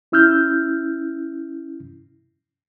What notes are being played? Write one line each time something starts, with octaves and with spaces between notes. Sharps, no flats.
C#4 E4 E6 F6 G6